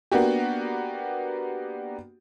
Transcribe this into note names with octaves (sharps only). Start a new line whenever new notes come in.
A#3 B3 D4 F#4 G4